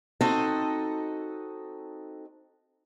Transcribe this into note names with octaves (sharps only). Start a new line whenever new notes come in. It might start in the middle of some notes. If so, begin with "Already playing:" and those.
C4 D#4 F#4 A4 D#5